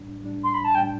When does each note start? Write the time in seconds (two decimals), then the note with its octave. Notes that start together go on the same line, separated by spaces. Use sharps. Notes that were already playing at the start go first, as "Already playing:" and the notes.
Already playing: A2 G3 D4
0.22 A2 G3 D4
0.44 C6
0.54 B5
0.64 A5
0.75 A2 G3 D4 G5